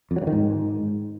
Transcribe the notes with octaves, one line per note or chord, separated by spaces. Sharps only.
F2
F#3
G2
D#3
G#2